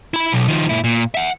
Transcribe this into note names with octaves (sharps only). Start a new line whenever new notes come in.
E4 B5
B1
D#3 F3
A#2 E4
A#2
E5 F#5